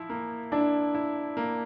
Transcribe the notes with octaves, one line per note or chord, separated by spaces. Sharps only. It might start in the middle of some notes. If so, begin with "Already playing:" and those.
Already playing: F3 E4
A#3
D4 E4
E4
A#3